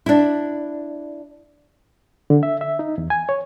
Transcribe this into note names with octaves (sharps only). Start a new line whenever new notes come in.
D4 E4
D3
E5
E5
D#4
E2
G#5
C#5